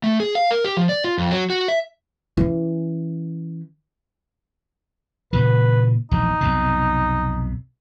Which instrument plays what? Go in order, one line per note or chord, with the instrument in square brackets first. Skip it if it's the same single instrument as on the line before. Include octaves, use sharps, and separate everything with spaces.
[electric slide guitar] A3
G#4
F5
A#4
G4
F3
D5
F4
F2
F#3
F#4
E5
[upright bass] E3 C#4
[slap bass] A#2 C#3 E3 [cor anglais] B4
[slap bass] E1 A#1 E2 [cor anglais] D#4
[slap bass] B1 F2 C3